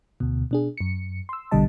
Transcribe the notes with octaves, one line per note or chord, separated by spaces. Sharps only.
D2 B2
B2 D4 G#4
F#2 C#7
C6 E6
A#1 B2 D3 G3 D#5 A5